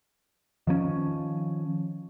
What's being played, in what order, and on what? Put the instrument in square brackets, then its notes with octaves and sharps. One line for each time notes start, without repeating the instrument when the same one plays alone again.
[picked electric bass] D#3 F3 A#3 C#4